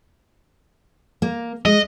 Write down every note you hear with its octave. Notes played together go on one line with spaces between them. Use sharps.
A#3
G#3 D#5